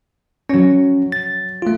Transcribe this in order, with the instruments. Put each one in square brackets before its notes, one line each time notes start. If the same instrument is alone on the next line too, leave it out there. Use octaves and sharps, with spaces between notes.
[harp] F#3 C#5 [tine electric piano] C#4
[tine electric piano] A6
A3 F4